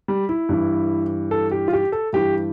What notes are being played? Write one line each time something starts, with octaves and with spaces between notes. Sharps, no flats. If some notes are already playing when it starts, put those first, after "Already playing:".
G3
E4
G2 E3
A4
G4
F4
G4
A4
G2 E3 G4